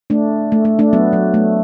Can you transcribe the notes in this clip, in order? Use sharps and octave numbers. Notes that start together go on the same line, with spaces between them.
A3 D4
A3
A3
A3 D4
F#3 B3
F#3
A3